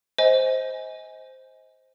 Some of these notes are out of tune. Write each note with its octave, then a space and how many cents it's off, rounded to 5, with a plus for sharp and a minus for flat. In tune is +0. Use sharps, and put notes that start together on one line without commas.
C5 +0 D#5 +25 G#5 +0